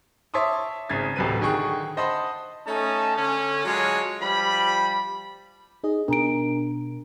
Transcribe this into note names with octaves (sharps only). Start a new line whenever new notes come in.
C#5 E5 A5 C6 D6 D#6
G#1 C#3 G#4 G#6 A6
A1 D2 C3 F#3 B4 D#7
D3 D#3 G#4 G5 C#6 F#6
C5 D#5 F#5 A5 B5 C6
A3 C#4 D#4 A5
D3 C#4
F#3 G#3 D4 F4 C#5
F3 G3 B5
D#4 G#4 D#5
B2 D4 A#4 A#5 D7